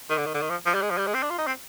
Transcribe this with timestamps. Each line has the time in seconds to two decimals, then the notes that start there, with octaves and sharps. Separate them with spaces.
0.10 D#3
0.18 D3
0.26 D#3
0.34 D3
0.42 D#3
0.50 F3
0.66 F3
0.74 G3
0.82 G#3
0.90 F3
0.98 G3
1.07 G#3
1.14 C4
1.23 D4
1.30 F4
1.38 D#4
1.47 C4